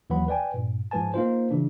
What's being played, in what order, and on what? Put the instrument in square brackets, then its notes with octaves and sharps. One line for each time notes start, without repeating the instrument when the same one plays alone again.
[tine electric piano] D#2 E3 F#3 B4 F#5 B5
B4 D5 G5 G#5
G2 A#2
G#2 F3 G#3 B4 G#5 A5
A#3 D#4 F4 C5
C#3 E3 D4